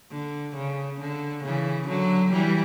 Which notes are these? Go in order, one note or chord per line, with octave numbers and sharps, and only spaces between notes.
D3
C#3
D3
C#3 E3
D3 F#3
E3 G3